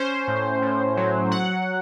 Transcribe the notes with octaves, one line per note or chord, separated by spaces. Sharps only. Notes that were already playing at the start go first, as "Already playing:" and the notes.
Already playing: C#4 C5
A2
A2
F#3
F#3 F#5